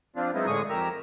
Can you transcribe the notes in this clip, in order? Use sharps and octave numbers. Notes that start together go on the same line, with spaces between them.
F3 C4 D4 F4
F#3 G#3 B3 C4 D#4 E4
A2 D3 G#3 G#4 C#6 D#6
F2 G4 A#4 A#5 E6